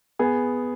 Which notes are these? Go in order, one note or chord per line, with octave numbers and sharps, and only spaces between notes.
B3 G#4